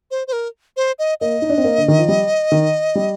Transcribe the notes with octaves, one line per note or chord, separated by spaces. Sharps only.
C5
C5
A#4
C5
D#5
A#3 D#5
D#4
D4
C4
A#3
D3
D#3
F3
G3
D#3
G3